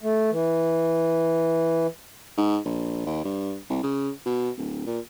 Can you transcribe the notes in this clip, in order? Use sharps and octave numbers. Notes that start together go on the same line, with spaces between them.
A3
E3
G#2
A#1
D#2
G2
C2
C#3
B2
D1
A#2